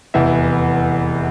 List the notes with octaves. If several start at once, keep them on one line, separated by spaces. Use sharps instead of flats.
F1 E2 E3 E5